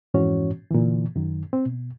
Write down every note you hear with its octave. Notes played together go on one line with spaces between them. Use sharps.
F2 G#2 E3 C#4 F#4 C#5
A#2 D3 E3
F#2 D#3
C4
B2